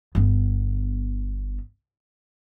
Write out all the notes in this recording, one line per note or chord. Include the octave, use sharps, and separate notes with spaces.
G1 B3